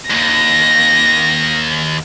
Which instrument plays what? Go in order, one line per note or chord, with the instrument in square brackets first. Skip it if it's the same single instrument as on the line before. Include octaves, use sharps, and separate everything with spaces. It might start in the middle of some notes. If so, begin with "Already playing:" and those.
[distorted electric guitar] D#2 G#2 [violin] A#6